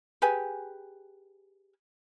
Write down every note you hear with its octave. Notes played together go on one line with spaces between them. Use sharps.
G4 G#4 B4 G#5